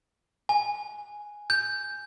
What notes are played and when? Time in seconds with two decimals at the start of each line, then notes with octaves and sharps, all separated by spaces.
0.49 G#5
1.50 G6